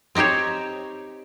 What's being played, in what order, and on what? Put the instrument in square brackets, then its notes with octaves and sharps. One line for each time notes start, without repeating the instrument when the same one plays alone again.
[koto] C4 D#4 G4 C5 C#5